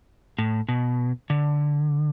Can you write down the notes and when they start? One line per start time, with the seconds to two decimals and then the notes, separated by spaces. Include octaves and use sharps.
0.39 A2
0.69 B2
1.30 D3